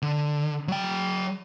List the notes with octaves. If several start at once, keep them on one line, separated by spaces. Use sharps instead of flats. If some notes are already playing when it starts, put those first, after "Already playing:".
D3
F#3 G5